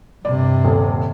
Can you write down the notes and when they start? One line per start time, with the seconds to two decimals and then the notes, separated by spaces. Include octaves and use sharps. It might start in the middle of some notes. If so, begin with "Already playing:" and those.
0.25 G2 C3 D5
0.65 D#1 A4